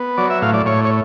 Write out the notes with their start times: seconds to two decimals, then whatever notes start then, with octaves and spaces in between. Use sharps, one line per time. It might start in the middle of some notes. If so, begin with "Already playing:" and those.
Already playing: B3
0.18 F#3 D5
0.30 E5
0.42 A2 F5
0.54 D5
0.66 A2 C#5
0.85 C#5